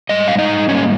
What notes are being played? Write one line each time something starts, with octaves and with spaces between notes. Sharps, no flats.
G#2 G3 D#5
F5
D#4 D#5
G#2 G3 A#3 C#4 C#5